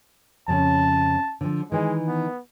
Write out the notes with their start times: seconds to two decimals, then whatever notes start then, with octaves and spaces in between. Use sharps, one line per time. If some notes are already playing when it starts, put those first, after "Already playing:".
0.48 F2 C#3 A5
1.41 D3 F3
1.72 D#3 E3 G#3
2.07 B3